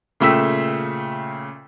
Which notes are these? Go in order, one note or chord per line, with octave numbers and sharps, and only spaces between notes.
A#2 C#3 A3 G5 E6 B6